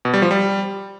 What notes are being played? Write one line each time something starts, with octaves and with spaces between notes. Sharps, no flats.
B2
G3
F3
G3